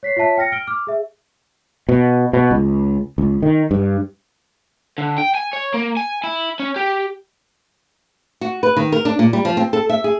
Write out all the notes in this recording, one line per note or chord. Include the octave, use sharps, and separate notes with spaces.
C#5 B6 C7
F4 C#5 E5 A5 B6
G5 F6 A#6 C#7
F6 D7 G7
D6 F6
G#4 E5
B2
B2
C#2
C#2
D#3
G2
D3
G5
G#5
C#5
A#3
G#5
E4
C#4
G4
F#4
B4
D#3
A#4
D4
A#2
G3
F3
C4
A4
E5
G#4